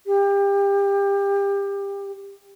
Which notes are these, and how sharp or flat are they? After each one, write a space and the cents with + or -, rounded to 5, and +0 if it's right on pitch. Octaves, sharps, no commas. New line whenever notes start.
G4 +25